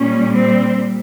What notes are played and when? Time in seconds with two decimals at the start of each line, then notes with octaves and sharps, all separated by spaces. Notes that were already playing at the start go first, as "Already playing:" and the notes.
Already playing: A#2 G3 C#4
0.34 C4